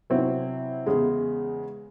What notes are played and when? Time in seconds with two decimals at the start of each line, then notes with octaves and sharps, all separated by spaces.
0.10 C3 F#3 C4 E4
0.86 E2 C#3 G#3